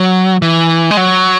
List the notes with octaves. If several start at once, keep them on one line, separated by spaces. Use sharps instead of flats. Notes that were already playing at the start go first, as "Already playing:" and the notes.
Already playing: F#3
E3
G#3
F#3